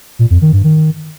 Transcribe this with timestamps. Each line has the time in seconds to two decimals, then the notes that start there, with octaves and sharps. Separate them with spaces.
0.19 A#2
0.30 F2
0.42 D#3
0.53 G2
0.64 D#3